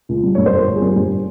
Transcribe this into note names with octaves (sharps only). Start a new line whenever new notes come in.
C#2
G3
G2 C#5
C5
G1 A#4
G1
G#4
G3
G2